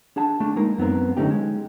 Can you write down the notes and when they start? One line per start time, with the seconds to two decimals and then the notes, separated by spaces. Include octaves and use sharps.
0.16 D4 G#4 F#5 A5
0.40 A3 D4
0.56 G#3 A#3 D#4 A#4
0.78 F#2 B3 C4 A#4
1.17 D3 A3 C#4 D#4 G4
1.31 G#3